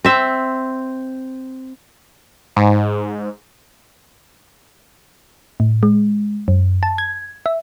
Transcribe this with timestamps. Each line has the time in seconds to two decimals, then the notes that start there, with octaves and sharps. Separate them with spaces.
0.05 C4 E5
2.56 G#2
5.60 A2
5.83 G#3
6.48 F#2
6.83 A5
6.98 G#6
7.46 E5